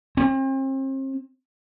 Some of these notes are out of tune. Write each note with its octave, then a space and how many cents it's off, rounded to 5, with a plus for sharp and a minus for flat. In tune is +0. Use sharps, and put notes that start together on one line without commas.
C4 +40